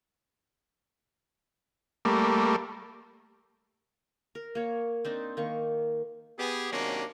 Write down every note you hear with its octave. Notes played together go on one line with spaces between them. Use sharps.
G3 A3 A#3
A#4
A#3 C#5
C4 D4 D#4
D#3 A#3 C#6
B3 G4 G#4
C3 D#3 F#3 A#3 C#4 D4